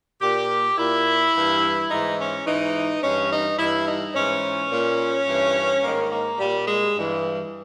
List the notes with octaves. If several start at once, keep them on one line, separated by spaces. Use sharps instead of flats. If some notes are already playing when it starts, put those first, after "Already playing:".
A#2 G4
A#2 E4
G2 E3
G#2 E3 D#4
C#4
G#2 E3 D#4
G2 E3 C#4
D#4
G2 E3 E4
D#4
G#2 E3 C#4
A#2
G2 E3
G#2 D#3 A#3
A#3
A#2 G3
G#3
G2 E3